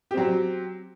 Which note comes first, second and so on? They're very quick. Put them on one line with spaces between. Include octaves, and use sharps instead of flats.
G4 C4 F#3